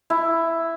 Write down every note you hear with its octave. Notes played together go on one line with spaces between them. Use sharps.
E4